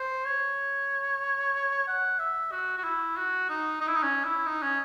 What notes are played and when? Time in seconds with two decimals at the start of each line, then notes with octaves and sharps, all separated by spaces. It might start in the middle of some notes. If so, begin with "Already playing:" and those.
Already playing: C5
0.25 C#5
1.88 F#5
2.19 E5
2.52 F#4
2.78 F#4
2.84 E4
3.17 F#4
3.49 D#4
3.81 D#4
3.88 E4
3.95 D#4
4.03 C#4
4.24 E4
4.46 D#4
4.63 C#4